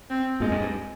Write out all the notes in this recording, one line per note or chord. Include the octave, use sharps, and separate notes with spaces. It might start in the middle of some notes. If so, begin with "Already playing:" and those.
C4
G2 A#2 G#3
F2 G#2
G2